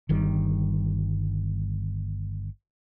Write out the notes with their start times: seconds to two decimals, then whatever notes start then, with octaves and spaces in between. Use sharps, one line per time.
0.09 G1 D#3 G3